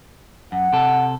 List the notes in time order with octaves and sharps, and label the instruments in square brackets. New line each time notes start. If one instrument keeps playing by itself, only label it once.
[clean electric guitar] F#2 [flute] F#5
[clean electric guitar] C3 A4